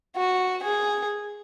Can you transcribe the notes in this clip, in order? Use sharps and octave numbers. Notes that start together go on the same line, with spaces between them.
F#4
G#4